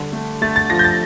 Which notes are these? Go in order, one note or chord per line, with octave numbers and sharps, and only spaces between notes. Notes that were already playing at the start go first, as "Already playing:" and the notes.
Already playing: D3 G3
A3
A3 A6
A6
F3 A#6
G6
A6